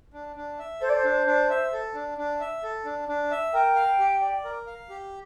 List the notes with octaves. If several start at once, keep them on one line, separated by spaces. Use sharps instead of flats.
D4
D4
E5
A4 C5
D5
C5
D4
D4
E5
A4
D4
D4
E5
A4
D4
D4
E5
A#4 G5
F5
G4
D5
A#4
F5
G4